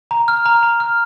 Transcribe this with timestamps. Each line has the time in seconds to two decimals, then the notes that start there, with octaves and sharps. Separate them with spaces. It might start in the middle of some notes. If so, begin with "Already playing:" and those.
0.11 A#5
0.28 F6
0.46 A#5
0.63 A#5
0.80 F6